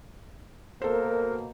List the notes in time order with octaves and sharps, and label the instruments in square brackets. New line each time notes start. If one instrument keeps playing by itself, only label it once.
[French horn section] B2 A#3 [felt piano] A4 C5 [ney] A#4